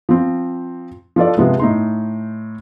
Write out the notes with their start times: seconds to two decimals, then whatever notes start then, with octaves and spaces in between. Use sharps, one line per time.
0.09 F3 C4
1.16 F3 F4 A4 D5
1.37 C3 F3 G#3 B3
1.60 A2 D#4 C6